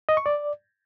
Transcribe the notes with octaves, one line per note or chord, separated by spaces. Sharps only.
D#5
C#6
D5